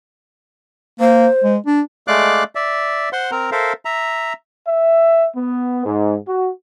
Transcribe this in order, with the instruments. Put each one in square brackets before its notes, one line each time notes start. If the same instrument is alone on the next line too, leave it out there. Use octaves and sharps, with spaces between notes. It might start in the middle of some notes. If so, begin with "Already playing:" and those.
[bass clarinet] A#3 [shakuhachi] C5
[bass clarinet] G#3
D4
[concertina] G#3 A3 D5 F5 D6 F#6
D5 E5
C5 F#5 C6
C4 A#4 A#5
A4 A#4 C5 E5 F5
E5 A#5
[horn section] E5
B3
G#2
F#4